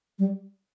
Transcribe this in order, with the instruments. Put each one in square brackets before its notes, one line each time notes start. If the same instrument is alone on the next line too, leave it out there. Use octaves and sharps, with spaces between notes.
[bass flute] G3